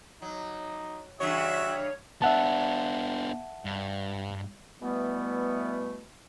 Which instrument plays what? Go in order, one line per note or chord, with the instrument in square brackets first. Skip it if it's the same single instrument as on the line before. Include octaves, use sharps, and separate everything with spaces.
[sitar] F#3 [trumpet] D#4
[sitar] G2 C#3 E3 [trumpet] F#4 [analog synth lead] C#5 [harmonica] E5
[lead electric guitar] B3 D4 [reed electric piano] E5 F#5 A5
[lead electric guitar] G2
[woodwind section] B2 E3 G3 A3 B3